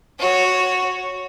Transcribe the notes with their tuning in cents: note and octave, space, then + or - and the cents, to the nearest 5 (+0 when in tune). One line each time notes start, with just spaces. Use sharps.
F#4 -5 C#5 +0